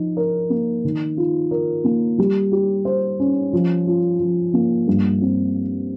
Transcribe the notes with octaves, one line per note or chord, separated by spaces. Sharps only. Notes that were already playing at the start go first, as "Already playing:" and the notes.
Already playing: F3 D#4
A#4
A#3
D#3
F4
A#4
A#3
G3
G4
C5
C#4
F3
F4
F3
A#3
G2
C4